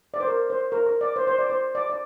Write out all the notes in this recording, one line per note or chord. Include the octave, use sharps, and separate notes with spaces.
D5
C5
A#4
C5
A#4
A#4
D5
C5
C5
D5
C5
D5
D5